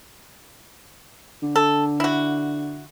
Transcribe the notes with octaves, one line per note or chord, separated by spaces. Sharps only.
D3
A4
E4 F#4